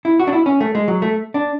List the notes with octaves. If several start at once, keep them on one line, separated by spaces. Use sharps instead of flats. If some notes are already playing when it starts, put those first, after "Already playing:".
E4
F#4
D4
E4
C#4
A3
G#3
F#3
A3
D4